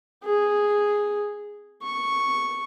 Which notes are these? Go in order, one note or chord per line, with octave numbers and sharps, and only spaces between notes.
G#4
C#6